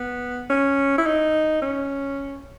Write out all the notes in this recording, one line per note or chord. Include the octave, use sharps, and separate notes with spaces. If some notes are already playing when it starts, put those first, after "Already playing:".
Already playing: B3
C#4
E4
D#4
C#4